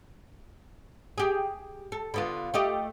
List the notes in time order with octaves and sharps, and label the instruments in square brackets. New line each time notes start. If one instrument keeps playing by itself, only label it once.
[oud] G4 G#4
A4
D3 B3 F4
A3 G4 D#5